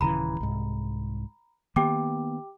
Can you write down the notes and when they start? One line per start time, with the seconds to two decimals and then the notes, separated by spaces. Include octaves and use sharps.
0.01 D#1 C#3 E3 A#5 B5
0.40 C2 G#2
1.76 D#3 A#3 B3 G4 G5 D6